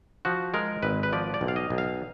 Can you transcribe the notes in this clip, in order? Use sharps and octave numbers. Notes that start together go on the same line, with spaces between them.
F3 F#4
G#3 A#4
G#1 B4
B4
F3 D5
D5
B1
F5
D#5
B1
F5